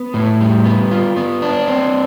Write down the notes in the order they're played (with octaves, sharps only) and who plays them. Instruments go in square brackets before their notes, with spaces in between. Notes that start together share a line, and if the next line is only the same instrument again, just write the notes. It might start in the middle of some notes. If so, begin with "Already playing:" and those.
Already playing: [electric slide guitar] B3
A2
G3
B3
F4
B3
D4
C4